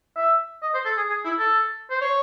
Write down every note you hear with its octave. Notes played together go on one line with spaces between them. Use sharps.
E5
D#5
C5
A4
G#4
G#4
E4
A4
C5
C#5